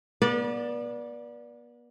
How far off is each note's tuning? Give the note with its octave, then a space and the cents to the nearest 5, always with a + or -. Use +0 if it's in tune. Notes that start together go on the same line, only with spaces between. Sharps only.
B3 -40 B4 -35 D5 +0